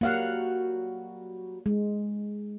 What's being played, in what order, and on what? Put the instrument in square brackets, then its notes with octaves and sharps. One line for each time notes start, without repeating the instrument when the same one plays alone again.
[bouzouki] F#3 G3 F#4 [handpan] A#3 F5 F#5
[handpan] G#3